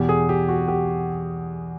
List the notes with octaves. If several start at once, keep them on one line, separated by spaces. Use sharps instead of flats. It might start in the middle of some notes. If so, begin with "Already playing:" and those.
Already playing: E2 B2 G4
G#4
G4
F#4
G4